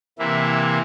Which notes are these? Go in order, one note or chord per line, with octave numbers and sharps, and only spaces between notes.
C3 E3 A#3 E4